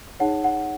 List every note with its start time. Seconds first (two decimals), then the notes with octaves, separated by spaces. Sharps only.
0.20 D#4 G#4 C#5 F#5
0.44 F#5